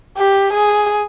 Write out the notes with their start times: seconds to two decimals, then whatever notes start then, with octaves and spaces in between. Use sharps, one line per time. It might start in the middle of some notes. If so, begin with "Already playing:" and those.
0.17 G4
0.53 G#4